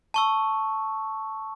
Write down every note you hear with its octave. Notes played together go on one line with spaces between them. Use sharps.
A5 C#6 E6